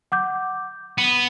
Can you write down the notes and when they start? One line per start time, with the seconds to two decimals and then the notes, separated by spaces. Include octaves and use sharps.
0.12 F#5 D6 G6
0.98 B3 D#7 F#7